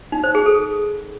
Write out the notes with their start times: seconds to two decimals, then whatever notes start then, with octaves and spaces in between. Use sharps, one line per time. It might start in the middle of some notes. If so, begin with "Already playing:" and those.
0.12 D#4
0.24 C5
0.35 G#4
0.46 A4